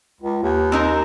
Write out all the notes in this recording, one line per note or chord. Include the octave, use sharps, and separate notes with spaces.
C#2
D#2
C4 D#4 A#4